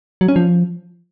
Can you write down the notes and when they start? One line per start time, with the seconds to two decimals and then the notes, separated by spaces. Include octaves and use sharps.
0.21 F#3
0.28 C#4
0.36 F3